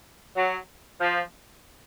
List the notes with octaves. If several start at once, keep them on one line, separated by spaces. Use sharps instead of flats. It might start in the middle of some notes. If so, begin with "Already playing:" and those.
F#3
F3